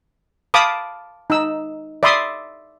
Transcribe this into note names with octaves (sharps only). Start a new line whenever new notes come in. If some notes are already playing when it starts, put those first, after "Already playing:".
F5 A5 B5 D6 D#6
D#4 E6
D5 E5 B5 C6 D#6